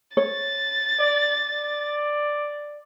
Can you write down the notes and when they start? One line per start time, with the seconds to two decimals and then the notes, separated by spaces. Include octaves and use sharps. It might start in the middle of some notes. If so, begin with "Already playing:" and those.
0.17 C#5 A6
0.99 D5
1.51 D5